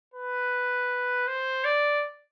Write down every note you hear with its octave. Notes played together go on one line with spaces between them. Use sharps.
B4
C5
D5